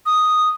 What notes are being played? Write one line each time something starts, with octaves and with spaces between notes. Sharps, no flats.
D#6